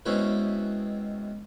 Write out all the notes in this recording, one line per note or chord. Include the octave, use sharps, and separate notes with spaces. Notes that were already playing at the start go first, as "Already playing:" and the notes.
B2 G#3 C4 C#4 E4 B4